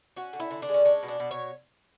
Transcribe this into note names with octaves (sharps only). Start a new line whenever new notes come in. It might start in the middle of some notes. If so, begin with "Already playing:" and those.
C#4 F#4
D3
E4
D3
D4
G#3
C#4
C#4 D4
B2
D4
B2
C#5